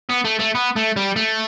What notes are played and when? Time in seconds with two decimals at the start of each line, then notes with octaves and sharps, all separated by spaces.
0.09 B3
0.25 A3
0.39 A3
0.55 B3
0.76 A3
0.96 G3
1.16 A3